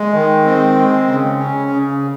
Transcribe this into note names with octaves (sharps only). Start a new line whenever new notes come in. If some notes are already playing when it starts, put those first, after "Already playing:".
Already playing: G#3
D#3
C4
G#3
C#3
C#4
C#3